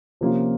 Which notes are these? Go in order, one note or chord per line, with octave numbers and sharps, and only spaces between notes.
C3 F3 A#3 C#4 F4